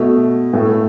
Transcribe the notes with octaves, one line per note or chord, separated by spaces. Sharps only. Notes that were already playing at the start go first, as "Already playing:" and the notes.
Already playing: B2 A3
A2 A3